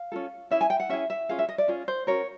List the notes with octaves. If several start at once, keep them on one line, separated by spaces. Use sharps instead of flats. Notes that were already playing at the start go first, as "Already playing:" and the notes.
Already playing: F5
C#4 F4 A4
C#4 E4 G#4 E5
G#5
G5
F#5
C#4 E4 G#4 E5
E5
C#4 F4 G#4 F5
E5
D#5
D5
C#4 F4 G#4
C5
C#4 F#4 A#4 C#5